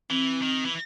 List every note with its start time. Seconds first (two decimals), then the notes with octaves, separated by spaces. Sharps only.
0.10 E3 C4
0.42 D#3
0.65 E3